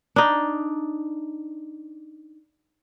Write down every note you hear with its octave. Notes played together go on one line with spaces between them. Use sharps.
D4 D#4